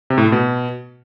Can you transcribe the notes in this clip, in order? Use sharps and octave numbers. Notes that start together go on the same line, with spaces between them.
C3
A2
A3
B2